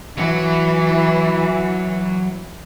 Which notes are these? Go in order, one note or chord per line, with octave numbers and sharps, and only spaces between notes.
E3 F#3